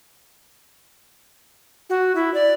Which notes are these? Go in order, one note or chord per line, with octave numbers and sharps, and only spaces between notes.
F#4
E4
D5